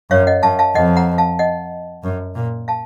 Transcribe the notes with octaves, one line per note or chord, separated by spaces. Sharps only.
F#2 C#5 F5
D#5 F#5
F#2 F5 A5
F5 A5
F2 D#5 F#5
F#5 A#5
F5 A5
D#5 F#5
F#2
A#2
F5 A5